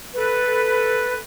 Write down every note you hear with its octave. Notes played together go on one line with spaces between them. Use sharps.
A4 B4